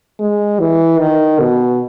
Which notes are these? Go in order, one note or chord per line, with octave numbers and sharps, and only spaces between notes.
G#3
E3
D#3
B2